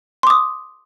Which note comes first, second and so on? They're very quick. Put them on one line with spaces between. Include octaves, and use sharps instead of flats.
C6 D6 D#6